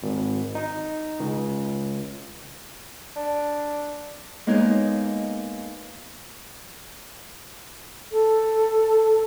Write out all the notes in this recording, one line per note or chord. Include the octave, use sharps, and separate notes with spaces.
G#1
D#4
C#2
D4
G#3 A#3 B3 D#4 C#5 D#5
A4